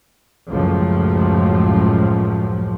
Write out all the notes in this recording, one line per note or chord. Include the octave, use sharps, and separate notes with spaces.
C#2 F#2 A2 F3